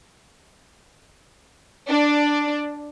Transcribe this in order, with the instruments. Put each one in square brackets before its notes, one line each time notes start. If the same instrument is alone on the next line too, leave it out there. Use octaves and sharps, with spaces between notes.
[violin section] D4